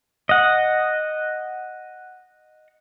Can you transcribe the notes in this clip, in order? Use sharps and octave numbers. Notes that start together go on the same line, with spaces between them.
D#5 F#5